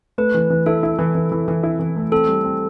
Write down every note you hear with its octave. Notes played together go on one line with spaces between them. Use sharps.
A3 B4
E3
E3
E4 A4
E4
E3
E3
E3
E3
E4
E3
A3
C4 A4
G3
C4